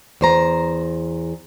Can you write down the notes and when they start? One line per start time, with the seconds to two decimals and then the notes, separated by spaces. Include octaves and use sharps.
0.21 E2 C5 A#5